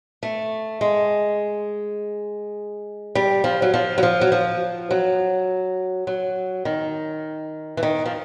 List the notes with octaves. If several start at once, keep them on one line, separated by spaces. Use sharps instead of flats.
A3
G#3
G3
F3
F#3
F3
F#3
F3
F#3
F3
F#3
F#3
D#3
E3
D#3
F3